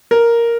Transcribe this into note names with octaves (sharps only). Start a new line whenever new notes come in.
A#4